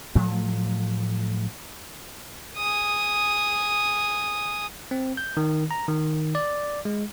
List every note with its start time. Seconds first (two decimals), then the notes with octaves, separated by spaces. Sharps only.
0.15 A2 F3 F#3 A3
2.57 G#4 D#6
4.91 C4
5.17 G6
5.37 D#3
5.71 A#5
5.88 D#3
6.35 D5
6.85 G#3